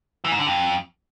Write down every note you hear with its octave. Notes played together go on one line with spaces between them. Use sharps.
E3
G#2
D3
F2